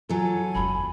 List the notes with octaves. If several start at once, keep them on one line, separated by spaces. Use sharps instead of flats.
F#3 F4 A4 G#5
F#1 E2 B5